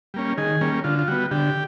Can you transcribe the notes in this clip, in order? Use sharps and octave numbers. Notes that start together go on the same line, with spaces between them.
G3 A#3 C#4
D#3 G#4
G3 A#3 C#4
D3 F4
F4
G3 B3 F#4
D3 G4